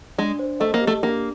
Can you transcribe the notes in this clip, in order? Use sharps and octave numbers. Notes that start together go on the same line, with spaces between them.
G#3 D4
C5
A3 D#5
A#3
G4
A3
A#3 D4